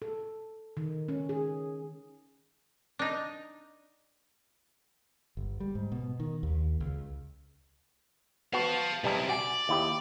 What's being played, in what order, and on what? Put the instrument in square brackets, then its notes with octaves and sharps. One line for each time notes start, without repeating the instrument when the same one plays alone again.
[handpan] A4
D#3
C#4
G#4
[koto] D4 D#4
[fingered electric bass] G1
G3
G#2
B2
D#3
D#2
C#2
[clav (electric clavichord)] B3 F#4 [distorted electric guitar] F5 A5
[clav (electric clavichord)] B1 G3 A5 [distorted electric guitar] C3 E4
[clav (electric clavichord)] F#4 G#5 [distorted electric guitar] D5
[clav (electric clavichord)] D#2 E4 G4